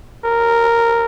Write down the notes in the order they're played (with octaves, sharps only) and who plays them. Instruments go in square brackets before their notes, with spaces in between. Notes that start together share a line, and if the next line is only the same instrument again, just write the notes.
[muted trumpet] A#4